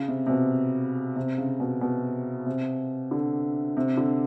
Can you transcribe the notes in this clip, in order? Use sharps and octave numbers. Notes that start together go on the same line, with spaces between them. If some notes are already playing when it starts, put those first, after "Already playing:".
Already playing: C#3
C3
C3
B2
C3
C#3
B2
B2
C3
D3
C3
D3